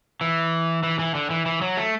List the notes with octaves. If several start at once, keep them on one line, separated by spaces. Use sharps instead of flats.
E3
E3
E3
D3
E3
E3
F#3
A3